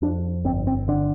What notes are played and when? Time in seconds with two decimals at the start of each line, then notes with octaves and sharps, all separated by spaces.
0.02 F2 D4
0.44 G1 C4
0.67 C4
0.88 D3 D4